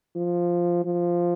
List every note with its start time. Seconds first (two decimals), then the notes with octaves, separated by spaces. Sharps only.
0.16 F3
0.85 F3